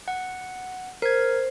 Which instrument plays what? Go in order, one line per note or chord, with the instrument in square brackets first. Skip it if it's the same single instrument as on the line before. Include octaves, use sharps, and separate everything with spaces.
[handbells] F#5
[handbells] A#4 G#6 [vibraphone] C5